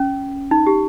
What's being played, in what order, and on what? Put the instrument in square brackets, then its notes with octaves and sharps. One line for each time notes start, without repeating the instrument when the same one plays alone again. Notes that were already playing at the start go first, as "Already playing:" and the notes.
Already playing: [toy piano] C#4
D#4
G4